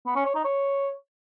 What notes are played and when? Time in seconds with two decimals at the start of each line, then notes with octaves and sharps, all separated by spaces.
0.06 B3
0.16 C#4
0.25 C#5
0.35 D#4
0.44 C#5